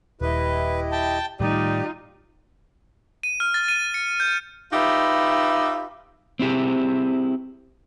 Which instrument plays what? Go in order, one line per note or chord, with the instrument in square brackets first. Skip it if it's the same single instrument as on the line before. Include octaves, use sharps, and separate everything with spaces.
[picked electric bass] D#1 [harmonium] E4 G4 D#5 [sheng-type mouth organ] B4
[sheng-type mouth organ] G5 A5
[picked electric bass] A2 D#3 G3 [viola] D#4 F4 [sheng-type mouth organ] G4 [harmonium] D5
[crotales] D#7
F6
A6
D#7
C#7
G6
[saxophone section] D#4 F4 G4 B4 E5
[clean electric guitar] C4 E4 G4 G#4